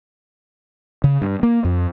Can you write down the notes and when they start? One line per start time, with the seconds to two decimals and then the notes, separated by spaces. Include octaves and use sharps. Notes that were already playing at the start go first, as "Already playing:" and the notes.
1.04 C#3
1.22 G2
1.43 A#3
1.65 F2